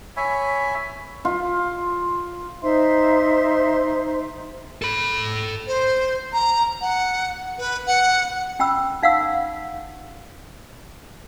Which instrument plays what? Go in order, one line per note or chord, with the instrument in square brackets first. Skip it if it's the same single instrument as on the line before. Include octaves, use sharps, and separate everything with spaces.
[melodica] C#5 E5 G#5 B5
[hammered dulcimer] F4
[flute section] D#4 C5 E5 C6
[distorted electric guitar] A4 B5
[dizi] C5
A#5
F#5
B4
F#5
[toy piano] C#4 G5 B5 E6
D#4 F5 F#5 E6